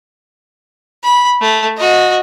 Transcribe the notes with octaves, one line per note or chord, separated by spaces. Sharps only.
B5
A3
F#4 D#5